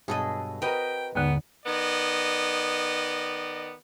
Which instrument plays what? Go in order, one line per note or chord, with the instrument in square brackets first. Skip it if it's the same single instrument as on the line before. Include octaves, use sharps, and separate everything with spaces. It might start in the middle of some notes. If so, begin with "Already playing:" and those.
[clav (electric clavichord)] G2 B2 F#3 [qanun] G#4 A4 D#5
[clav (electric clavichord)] C4 F#4 A#4 [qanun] B4 D#5 [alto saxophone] G5
[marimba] D#2 D3 [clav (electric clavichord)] G#2 [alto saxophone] B3
[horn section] D#3 B3 D5 D#5